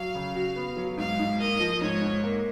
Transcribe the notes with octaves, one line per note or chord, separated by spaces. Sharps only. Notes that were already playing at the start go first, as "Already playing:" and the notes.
Already playing: F#3 F5
C#3
F#4
B3
F#3
G#2 F5
G#2
A#3 D#5
F3
G#2 C#5
G#2
A#3